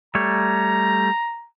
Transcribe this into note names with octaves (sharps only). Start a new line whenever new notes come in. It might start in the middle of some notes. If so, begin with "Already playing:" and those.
G3 A3 C#5 A#5